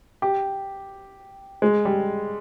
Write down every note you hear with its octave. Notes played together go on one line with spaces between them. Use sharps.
G4
G#3
G3